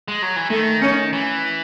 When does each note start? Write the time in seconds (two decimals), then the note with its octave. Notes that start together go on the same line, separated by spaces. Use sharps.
0.08 G#3
0.22 F#3
0.36 E3
0.50 D#3 A3
0.82 C#4
1.13 E3